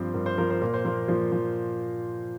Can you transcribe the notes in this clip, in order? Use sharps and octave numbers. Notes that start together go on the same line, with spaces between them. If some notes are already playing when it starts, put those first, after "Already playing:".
Already playing: G2 F3 C4 C5
G2 A#4
C5
F3 A#4
C5
A#2 A#4
C5
F3 A#3 A#4
A#2 F3 F4
F3